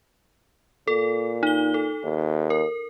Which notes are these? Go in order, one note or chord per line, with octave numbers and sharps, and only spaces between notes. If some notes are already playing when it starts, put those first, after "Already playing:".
A#2 A4
D#4 G7
A4
D#2
A#4